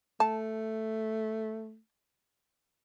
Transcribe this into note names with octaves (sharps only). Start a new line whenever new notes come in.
A3 A5